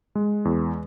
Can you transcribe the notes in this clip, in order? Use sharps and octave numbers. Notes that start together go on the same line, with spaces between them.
G#3
E2